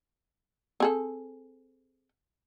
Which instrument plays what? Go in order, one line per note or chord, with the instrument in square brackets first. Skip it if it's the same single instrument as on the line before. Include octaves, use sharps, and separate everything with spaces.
[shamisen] C4 G#4 A4